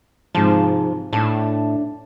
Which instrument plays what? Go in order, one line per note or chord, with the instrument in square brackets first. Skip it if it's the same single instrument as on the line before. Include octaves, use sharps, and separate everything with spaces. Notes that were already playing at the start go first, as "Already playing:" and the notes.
[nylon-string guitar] G#2 C3 A5 [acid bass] F3
[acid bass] A2 [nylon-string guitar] D4 A5